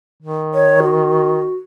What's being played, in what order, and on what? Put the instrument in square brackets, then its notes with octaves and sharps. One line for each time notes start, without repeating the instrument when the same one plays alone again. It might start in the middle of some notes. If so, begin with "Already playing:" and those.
[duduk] D#3
[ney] C#5
F#4